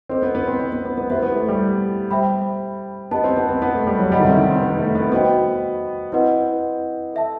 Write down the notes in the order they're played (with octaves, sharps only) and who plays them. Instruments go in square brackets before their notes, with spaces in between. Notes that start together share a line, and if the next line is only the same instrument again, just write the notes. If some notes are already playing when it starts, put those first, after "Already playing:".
[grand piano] C4 [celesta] A4 C5 D#5
[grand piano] B3
B3
C4
C4
B3
B3
B3
[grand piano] B3 [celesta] E4 G4 C5 E5
[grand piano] B3
A3
G3
[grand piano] G3 [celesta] C5 E5 G5 B5
[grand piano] B3 [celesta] G4 D#5 A5
[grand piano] C4
B3
C4
B3
A3
G3
F#3
[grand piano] G3 [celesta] A4 D#5 F#5 B5
[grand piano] D#3
C3
D#3
C4
B3
A3
B3
[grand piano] B3 [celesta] F#4 C5 D#5 G5
[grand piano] C4 [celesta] E4 B4 D#5 F#5
[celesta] A4 E5 A5